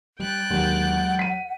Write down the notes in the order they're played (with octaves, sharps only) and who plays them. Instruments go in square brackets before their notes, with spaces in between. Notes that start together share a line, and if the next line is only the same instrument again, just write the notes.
[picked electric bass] G3 [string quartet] G5 F#6 A6
[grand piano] D#2 [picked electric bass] F#3 G#3 [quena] F#5
[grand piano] B6 D#7